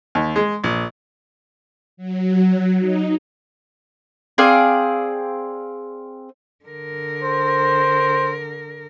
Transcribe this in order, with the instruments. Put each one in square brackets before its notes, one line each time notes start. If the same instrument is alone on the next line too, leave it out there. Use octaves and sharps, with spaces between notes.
[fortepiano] D#2
G#3
A#1
[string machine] F#3
D#4
[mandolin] C4 G#4 D5 F5
[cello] D3 A#4
[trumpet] C5